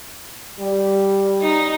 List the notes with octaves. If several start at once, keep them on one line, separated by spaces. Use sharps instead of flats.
G3
D#4